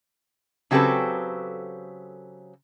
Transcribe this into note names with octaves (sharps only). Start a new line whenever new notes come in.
C#3 F#3 C4 G4 A4 B4